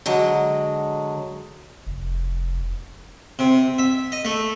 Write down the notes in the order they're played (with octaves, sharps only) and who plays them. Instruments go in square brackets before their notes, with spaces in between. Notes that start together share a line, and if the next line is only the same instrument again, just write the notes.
[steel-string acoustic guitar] D3 F#3 G#3
[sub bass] F1
[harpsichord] C3
E5
D#5
A3